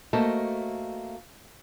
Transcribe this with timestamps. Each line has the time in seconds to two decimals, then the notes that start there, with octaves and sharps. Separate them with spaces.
0.13 A3 A#3 F#4 A4 C5 D#5